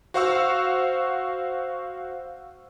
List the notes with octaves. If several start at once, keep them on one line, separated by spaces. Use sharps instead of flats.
F#4 C5 F5 F#5 C#6 E6